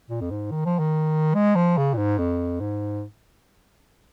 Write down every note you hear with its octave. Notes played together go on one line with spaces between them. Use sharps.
A#2
F2
G#2
D#3
F3
D#3
G#3
F3
C#3
A#2
G#2
F2
G#2